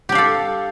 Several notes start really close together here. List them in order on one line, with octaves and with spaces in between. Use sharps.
G4 D4 F5 A4